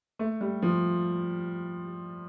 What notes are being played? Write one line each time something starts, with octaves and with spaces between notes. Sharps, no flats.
A3
G3
F3